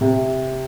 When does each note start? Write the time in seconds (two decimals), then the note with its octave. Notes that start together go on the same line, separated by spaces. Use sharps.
0.01 C3